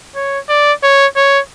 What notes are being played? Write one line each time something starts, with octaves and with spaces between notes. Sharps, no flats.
C#5
D5
C#5
C#5